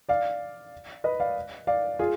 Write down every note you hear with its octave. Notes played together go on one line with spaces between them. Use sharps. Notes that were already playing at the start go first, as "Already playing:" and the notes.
D5 F5
B4 D#5
D5 F5
D5 F5
F4 G#4